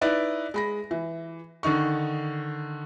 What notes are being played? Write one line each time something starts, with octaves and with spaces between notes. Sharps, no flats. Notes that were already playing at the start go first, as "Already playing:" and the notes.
D#4 E4 B4 D5 D#5
G#3 B5 A#6
E3
D3 D#3 D#4 C#6